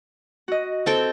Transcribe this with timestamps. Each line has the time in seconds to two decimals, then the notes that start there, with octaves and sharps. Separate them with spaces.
0.48 F#4 D#5
0.86 C4 A4 G5